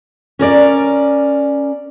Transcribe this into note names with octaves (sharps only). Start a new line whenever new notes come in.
C#4 A#4 D5